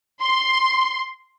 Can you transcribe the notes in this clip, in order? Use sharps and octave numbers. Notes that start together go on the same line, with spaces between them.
C6